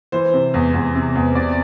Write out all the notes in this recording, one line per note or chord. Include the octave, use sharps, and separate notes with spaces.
E3 C5
C3
E2
E2
C3
E2
C3 D5